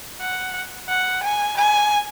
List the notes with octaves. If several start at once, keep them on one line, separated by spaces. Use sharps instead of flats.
F#5
F#5
G#5
G#5